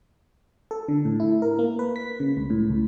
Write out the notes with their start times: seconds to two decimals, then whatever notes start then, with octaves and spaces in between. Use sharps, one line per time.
0.71 A4
0.88 D3
1.05 A2
1.20 E4
1.42 A#4
1.59 A#3
1.79 B4
1.96 B6
2.20 C#3
2.37 C#2
2.50 A2
2.70 C#2